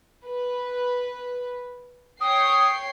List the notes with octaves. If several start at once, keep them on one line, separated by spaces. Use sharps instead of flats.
B4
C#5 G5 D#6 C7